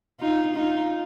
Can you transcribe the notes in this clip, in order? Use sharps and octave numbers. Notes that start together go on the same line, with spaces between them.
D#4 F4
D#4 F4